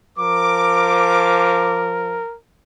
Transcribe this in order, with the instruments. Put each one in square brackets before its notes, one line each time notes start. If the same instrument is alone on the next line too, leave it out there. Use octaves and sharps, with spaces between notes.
[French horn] F3 [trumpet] A#4 [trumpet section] D6